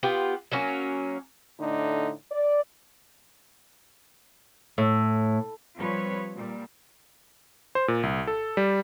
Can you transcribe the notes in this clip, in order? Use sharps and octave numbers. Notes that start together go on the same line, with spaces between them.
B3 F4 G4
F#3 A#3 C#4
A2 D3 A3 D4 D#4
D5
A2
F3 G3 C4 B4 C#5
A#2 G3
C5
A#2
C2
A4
G3